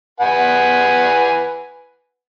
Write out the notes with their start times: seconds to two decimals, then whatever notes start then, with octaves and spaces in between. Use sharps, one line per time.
0.20 B4 F#5 G#5